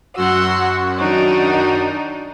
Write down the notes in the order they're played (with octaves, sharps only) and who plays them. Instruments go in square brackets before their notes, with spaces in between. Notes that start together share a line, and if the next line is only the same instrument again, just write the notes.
[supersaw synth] F#2 F#4 [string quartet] F#5 C6 E6
[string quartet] D#3 D4 D#4